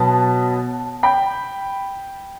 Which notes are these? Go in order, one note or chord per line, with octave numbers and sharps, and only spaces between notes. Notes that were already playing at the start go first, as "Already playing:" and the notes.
Already playing: B2 F#3 B3 A5
G5 B5